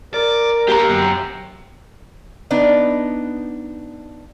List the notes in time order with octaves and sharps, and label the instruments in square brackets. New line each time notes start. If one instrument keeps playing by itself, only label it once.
[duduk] A#4 [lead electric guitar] D5
[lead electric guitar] A#3 [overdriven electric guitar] G4 A#5
[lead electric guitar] F#2
[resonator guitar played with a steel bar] B3 D4 D#4